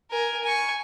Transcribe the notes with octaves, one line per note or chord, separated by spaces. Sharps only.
A#4 G#5
G#5 C#6